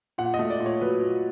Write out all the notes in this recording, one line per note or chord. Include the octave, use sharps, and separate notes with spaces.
A#2 F#5
D#5
A3
D5
A#2
C#5
F#3 B4
A#2